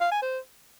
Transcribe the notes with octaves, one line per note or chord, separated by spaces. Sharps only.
F5
G#5
C5